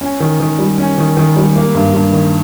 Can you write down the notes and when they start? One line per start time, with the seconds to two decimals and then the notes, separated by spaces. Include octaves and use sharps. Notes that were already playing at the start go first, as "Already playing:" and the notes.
0.01 C#4
0.20 D#3
0.40 D#3
0.59 G3
0.78 C#4
0.98 D#3
1.17 D#3
1.36 G3
1.55 A#3
1.75 G2
1.94 G2
2.13 D#3